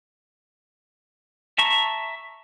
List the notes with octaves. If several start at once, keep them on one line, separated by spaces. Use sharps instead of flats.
E5 A5 A#5 C#6